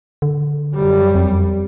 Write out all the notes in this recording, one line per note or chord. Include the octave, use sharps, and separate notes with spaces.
D3
F#2 G3
F2